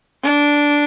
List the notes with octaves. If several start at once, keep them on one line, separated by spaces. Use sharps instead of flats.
D4